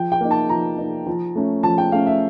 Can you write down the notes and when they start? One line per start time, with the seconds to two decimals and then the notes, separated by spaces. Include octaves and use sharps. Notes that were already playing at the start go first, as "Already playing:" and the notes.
Already playing: F3 G5
0.12 G5
0.21 A#3 D#4
0.31 A5
0.49 F3 A#5
0.78 A#3 D#4
1.07 F3
1.35 A3 C#4
1.63 F3 A5
1.78 G5
1.92 A3 C#4 F5
2.07 E5